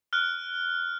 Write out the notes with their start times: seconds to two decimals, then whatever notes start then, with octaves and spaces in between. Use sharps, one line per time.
0.13 F6 F#6